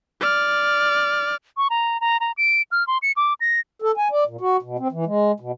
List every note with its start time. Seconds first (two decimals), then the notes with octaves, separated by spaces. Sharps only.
0.20 D5 F6
1.57 C#6
1.70 A#5
2.01 A#5
2.20 A#5
2.37 D7
2.71 F6
2.87 C6
3.02 C#7
3.16 D6
3.41 A#6
3.82 A4
3.97 G#5
4.12 D5
4.27 A#2
4.41 F#4
4.63 B2
4.79 C4
4.92 E3
5.06 G#3
5.40 B2